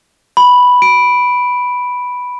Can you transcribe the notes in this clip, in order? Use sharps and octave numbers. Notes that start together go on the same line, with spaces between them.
B5
D7